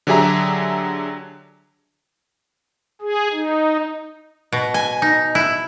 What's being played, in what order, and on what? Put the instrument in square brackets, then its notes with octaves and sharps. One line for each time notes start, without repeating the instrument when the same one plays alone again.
[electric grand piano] D3 F#3 G4 G#4 E5 A#5
[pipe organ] G#4
D#4
[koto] B2
G#5
D#4
E4